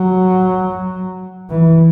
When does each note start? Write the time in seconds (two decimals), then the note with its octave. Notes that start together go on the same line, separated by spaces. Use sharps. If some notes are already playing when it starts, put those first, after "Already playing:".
Already playing: F#3
1.50 E3